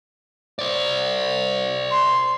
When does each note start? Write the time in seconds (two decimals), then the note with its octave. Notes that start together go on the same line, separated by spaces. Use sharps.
0.59 C5 D5
1.90 C6